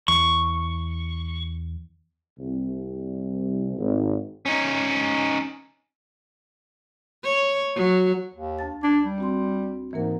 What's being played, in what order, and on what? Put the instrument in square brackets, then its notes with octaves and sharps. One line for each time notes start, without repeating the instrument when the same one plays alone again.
[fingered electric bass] E2 [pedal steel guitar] C#6
[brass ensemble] C2
G#1
[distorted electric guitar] C#4 D#4
[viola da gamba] C#5
F#3
[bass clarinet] D#2
[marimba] D2 A5 A6
[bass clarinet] D4 [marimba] G#6
[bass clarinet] G3
[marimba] C4 F#4 C6
[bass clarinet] G#2 [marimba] E3 A#3 A#4